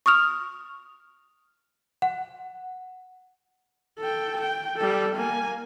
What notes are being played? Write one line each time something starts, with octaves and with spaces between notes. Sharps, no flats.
C#6 D#6 F6 F7
F#5
A4 G5
G5
G3 A4
A#3 G#5